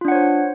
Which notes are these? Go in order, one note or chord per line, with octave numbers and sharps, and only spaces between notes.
D4 F4 C5 C#5 F#5